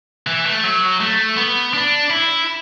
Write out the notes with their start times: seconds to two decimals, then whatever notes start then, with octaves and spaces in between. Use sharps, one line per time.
0.27 E3
0.45 A3
0.64 F#3
1.00 A3
1.37 B3
1.73 D4
2.10 E4